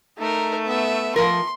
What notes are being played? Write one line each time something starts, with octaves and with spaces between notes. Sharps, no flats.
A3 D#4 A#4
B3 E5
F3 A#4 C6